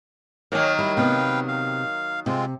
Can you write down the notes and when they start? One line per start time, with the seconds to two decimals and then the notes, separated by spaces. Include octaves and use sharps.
0.52 D#3 F#3 A#3 C#5 G#5
0.79 G3 E4
0.97 C3 B3 B4 F5 G5
1.48 F5
2.26 C3 G#3 C4 F4